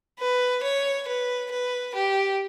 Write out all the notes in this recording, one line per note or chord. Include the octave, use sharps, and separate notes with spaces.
B4
C#5
B4
B4
G4